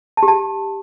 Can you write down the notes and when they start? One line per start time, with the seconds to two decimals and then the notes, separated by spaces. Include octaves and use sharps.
0.17 A5
0.23 G4
0.28 A5